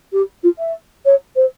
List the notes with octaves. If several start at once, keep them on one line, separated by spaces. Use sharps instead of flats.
G4
F4
E5
C#5
C5